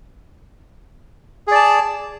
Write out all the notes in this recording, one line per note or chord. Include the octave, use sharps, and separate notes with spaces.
G#4 D5 A5